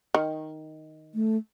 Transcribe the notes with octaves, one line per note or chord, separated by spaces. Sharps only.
D#3
A3